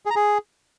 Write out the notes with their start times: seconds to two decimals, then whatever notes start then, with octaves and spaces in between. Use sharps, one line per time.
0.06 G#4
0.11 A#5
0.16 G#4